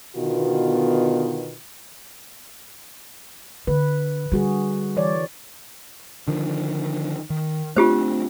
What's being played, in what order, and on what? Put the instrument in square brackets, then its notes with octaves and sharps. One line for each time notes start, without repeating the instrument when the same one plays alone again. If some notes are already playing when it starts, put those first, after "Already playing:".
[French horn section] B2 D3 D#3 B3 F4 F#4
[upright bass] D3 [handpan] B4
[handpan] D3 F#4 G#4 [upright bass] G3
[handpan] E3 C#5 D5
[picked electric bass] D3 D#3 F3
D#3
[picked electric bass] A3 C4 D4 [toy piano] F4 G4 C5